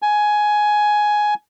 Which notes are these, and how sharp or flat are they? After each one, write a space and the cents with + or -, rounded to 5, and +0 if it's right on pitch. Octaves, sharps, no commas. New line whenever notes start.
G#5 +10